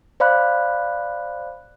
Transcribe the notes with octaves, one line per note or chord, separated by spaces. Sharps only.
C5 D5 F5 B5 F#6